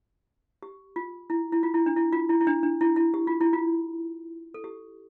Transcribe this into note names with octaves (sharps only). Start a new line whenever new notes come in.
G4
F4
E4
E4
F4
E4
D4
E4
F4
E4
E4
D4
D4
E4
E4
G4
F4
E4
F4
A4
G4